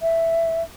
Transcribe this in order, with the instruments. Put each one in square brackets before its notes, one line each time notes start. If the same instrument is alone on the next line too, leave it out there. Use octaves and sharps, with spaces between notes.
[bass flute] E5